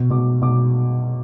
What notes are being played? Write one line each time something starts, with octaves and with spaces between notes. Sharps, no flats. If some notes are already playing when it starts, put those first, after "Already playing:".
Already playing: B2
B2 D6
B2 D6